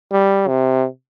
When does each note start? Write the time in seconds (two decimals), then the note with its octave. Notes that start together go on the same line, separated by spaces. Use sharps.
0.12 G3
0.48 C3